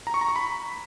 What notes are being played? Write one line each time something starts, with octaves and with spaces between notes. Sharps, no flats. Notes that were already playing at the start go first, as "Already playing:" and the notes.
A#5
C#6
A#5
C#6
B5